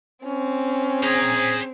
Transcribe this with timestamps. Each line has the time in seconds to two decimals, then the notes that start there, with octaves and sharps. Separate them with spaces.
0.25 C4 C#4
1.03 G#4 C5 A#5